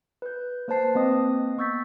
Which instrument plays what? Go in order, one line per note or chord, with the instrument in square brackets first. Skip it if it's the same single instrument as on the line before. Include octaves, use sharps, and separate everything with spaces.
[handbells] B4 G6
A#3 B4 C5 A5 C7
A#3 C4 D#5 D#6
B3 C#6 E6 G6 A6 B6